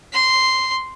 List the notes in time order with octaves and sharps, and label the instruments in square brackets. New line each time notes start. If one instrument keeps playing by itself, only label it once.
[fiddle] C6